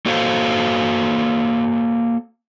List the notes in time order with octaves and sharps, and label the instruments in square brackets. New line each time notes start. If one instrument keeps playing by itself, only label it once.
[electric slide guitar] A#3 F#4 A4 C5 F5